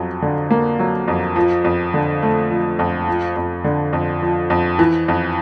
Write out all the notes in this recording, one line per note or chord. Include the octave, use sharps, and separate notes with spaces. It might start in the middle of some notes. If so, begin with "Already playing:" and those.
Already playing: F2 F#3
D3
A#3
F#3
F2
F3
F2
D3
A3
F3
F2
F3
F2
D3
F2
F3
F2
E3
F2